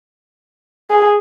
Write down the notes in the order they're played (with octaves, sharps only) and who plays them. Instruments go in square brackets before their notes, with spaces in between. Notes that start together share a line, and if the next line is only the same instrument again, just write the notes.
[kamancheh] G#4